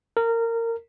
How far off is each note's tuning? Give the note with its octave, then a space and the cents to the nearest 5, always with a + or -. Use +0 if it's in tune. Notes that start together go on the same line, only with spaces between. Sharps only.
A#4 -20